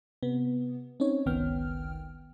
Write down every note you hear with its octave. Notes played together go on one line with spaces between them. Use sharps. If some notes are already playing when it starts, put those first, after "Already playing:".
C3 B3
C4 C#4 D#4 C#5
G1 C#2 D#3 B3 G5 F6